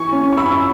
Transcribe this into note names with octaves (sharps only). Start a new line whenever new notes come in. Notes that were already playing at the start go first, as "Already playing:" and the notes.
Already playing: E3 G#5 C#6
C#4
C#6
F#2 B5 E6